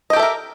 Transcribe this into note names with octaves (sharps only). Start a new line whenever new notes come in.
G4 A4 A#4 D#5 E5